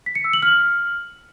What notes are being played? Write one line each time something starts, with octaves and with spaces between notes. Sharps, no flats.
B6
C#7
E6
F#7
F6